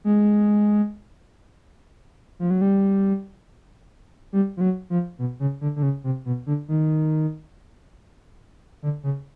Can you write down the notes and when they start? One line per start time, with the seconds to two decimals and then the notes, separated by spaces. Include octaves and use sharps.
0.04 G#3
2.39 F3
2.50 F#3
2.61 G3
4.33 G3
4.57 F3
4.61 F#3
4.90 F3
5.19 B2
5.40 C#3
5.61 D3
5.76 D3
5.83 C#3
6.04 C3
6.25 B2
6.46 D3
6.68 D#3
8.83 D3
9.03 C#3